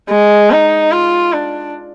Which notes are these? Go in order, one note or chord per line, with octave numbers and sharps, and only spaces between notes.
G#3
D#4
F4
D4